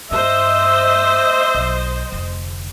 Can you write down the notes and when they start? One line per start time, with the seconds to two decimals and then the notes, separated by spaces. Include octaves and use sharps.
0.11 G2 C5 D#5 E5
1.54 B1
2.12 F1 D2